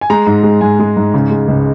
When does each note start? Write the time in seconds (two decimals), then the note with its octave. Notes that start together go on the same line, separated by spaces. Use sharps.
0.01 G#5
0.10 G#3 A#5
0.27 G#2
0.44 G#3
0.61 G#2 G#5
0.79 G#3
0.97 G#2
1.14 C#3
1.31 G#3
1.48 C#2